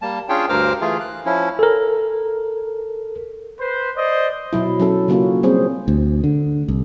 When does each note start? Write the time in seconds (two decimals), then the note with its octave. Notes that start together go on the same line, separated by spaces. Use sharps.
0.02 G3 A#3 A5
0.29 C#4 D4 F4 G#4 C#5 G5
0.49 D2 G2 A#4 C5 D6 F6
0.81 E3 A3 F4 G#4
1.01 F#6
1.25 F3 C#4 E4
1.59 A4 A#4
3.60 B4 C5
3.96 C5 D5 D#5
4.53 B2 F#3 E4
4.80 F#3 C#4 A4
5.08 C#3 F#3 A#3 C#4 F4 F#4
5.43 G3 C4 C#4 G#4 C5
5.88 D2
6.24 D3
6.68 C2